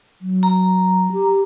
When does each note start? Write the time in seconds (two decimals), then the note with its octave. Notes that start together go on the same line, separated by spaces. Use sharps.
0.22 F#3
0.43 A#5
1.12 G4